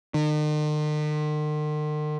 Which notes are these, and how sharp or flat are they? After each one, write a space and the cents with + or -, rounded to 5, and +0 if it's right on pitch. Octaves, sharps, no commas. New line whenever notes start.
D#3 -45